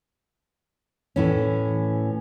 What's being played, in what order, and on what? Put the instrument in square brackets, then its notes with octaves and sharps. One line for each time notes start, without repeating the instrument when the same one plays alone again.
[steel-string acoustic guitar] A2 E3 C#4